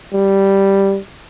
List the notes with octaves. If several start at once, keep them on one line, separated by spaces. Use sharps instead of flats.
G3